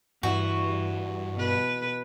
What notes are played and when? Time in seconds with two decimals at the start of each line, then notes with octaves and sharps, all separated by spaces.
0.23 G2 E3 F#4
1.35 B2 B4